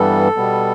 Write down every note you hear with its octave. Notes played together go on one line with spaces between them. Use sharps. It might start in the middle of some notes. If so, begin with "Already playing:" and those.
Already playing: G2 E3 G3 B3 A4
B2 G3 B3